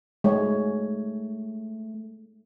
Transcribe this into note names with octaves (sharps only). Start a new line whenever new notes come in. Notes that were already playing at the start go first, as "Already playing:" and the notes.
G#3 A3 C#5